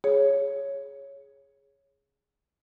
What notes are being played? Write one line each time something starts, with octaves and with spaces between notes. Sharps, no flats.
G#4 C#5